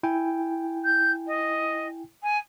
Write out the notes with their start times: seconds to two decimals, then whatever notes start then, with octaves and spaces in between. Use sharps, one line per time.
0.03 E4 G5 G#5
0.84 G6
1.27 D#5
2.23 G#5